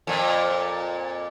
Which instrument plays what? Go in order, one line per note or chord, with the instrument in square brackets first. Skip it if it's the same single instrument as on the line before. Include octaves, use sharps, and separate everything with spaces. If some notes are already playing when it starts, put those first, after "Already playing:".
[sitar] F2 A#2